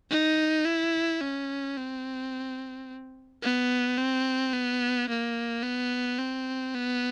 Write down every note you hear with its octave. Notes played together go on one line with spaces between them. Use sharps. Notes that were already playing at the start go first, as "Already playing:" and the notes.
D#4
E4
C#4
C4
B3
C4
B3
A#3
B3
C4
B3